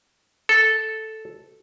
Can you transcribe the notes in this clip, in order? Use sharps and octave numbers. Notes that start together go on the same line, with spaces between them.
A4